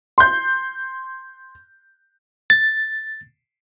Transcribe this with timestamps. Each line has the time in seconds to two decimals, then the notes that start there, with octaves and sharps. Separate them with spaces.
0.18 C6 G6
2.50 A6